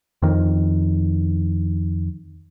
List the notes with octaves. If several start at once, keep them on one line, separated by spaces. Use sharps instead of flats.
F2 D#3